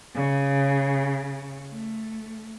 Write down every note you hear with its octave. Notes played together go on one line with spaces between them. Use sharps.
C#3
A3